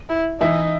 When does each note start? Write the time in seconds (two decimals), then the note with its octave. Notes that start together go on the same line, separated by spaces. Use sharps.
0.09 E4
0.41 E3 D#4 E4